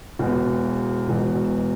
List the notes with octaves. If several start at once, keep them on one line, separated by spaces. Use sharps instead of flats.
E1 E2 B2
E1 E2 B2